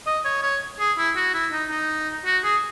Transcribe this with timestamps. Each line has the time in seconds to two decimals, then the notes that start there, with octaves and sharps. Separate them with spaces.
0.06 D#5
0.25 C#5
0.43 C#5
0.79 G#4
0.98 E4
1.16 F#4
1.34 E4
1.52 D#4
1.70 D#4
2.25 F#4
2.44 G#4